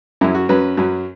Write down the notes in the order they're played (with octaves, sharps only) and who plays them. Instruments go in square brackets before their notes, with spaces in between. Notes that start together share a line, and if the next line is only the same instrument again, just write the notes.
[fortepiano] F#2 F#3 C#4 E4
F#4
F#2 F#3 C#4 B4
F#2 F#3 C#4